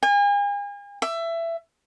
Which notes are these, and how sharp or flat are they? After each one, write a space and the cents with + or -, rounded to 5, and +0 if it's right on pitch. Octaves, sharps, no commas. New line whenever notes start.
G#5 -40
E5 +20